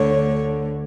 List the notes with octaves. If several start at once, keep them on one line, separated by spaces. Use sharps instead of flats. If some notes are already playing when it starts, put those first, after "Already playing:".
Already playing: D2 D3 C#5